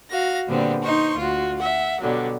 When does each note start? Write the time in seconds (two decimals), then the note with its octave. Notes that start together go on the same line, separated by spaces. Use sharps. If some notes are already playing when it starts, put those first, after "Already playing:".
0.10 F#4 F5 A#6
0.47 A#2 D3 G3 B3 C4
0.83 D#4 C5 C6 C#6
1.15 D2 F4 F#4
1.57 E5 F#5
2.00 B2 D3 F#3 G3